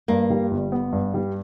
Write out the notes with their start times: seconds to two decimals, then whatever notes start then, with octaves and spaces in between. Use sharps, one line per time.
0.08 G2 A#3
0.30 G3
0.51 G1
0.72 B3
0.93 G2
1.14 G3